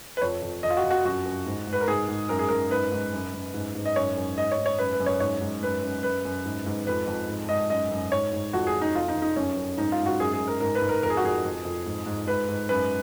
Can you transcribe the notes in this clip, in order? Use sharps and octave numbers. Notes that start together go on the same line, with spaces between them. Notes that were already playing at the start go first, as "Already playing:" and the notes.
B4
F2 C#5
F2
F2 D#5
F4
F#4
F2
F#4
F#2 F#4
F#2
G#2
G#2
B4
A#4
G#2 G#4
G#2
F#2 A#4
G#4
F#2 A#4
G#2 B4
G#2
F#2
F#2
G#2
G#2
D#5
F#2 C#5
F#2
G#2 D#5
C#5
G#2
C#5
F#2 B4
B4
F#2
C#5
G#2 C#5
G#2
F#2 B4
F#2
F#2 B4
F#2
G#2
G#2
F2 B4
F2
G#2
G#2 D#5
F#2 D#5
F#2
G#2 C#5
G#2
F2 F#4
G#4
F2
D#4
F2 F4
D#4
F2
D#4
F#2 C#4
F#2
G#2 D#4
F4
G#2
F#4
F#2 G#4
G#4
F#2
A#4
G#2 A#4
B4
G#2
A#4
F2 A#4
G#4
F#4
F2 G#4
F2
F2
G#2
G#2
G#2 B4
G#2
F#2 B4